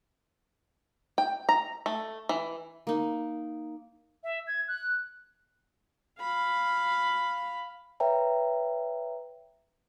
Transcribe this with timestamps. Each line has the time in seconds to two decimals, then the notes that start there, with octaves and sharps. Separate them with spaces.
1.18 G5
1.49 A#5
1.86 A3
2.29 E3
2.87 A#3 D#4
4.24 E5
4.47 G#6
4.68 F#6
6.21 F5 B5
8.00 B4 C#5 E5 G5 A#5